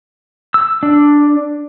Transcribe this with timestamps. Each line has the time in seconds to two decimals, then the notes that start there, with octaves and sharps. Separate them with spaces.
0.54 E6
0.83 D4